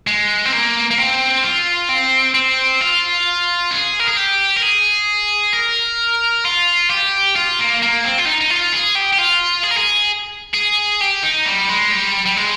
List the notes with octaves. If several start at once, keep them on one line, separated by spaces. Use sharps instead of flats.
G#3
C4
A#3
A#3
C4
F4
C4
C4
F4
G#4
A#4
G#4
G4
A#4
G#4
A#4
F4
G4
F4
A#3
A#3
C4
F4
D#4
D#4
F4
G#4
G4
G4
F4
G#4
A#4
G#4
G#4
G4
D#4
G3
G#3
G3
G3
G#3